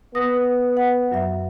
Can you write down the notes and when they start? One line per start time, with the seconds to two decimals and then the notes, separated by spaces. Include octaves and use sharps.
0.15 B3 D#6 A#6
0.77 F#5
1.12 F#2 F#3 E5